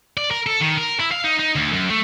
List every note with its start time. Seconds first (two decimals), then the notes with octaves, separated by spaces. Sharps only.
0.17 D5
0.31 A#4
0.46 A4
0.61 D#3
0.78 A#4
1.00 E4
1.12 F5
1.24 D#4
1.39 D#4
1.55 D2
1.73 F#2
1.90 A3